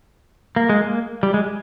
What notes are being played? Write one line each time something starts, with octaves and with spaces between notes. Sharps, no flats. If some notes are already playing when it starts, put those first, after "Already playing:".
A#3
G#3
A#3
G3
G#3